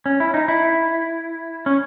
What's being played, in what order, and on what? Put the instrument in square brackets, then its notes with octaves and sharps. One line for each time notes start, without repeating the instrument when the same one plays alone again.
[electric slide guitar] C#4
E4
D#4
E4
C#4